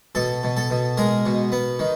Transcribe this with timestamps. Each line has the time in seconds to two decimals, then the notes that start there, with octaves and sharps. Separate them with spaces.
0.15 B2 A4
0.43 B2
0.57 A4
0.70 B2
0.98 G#3 A#4
1.25 B2
1.52 B3
1.79 D#3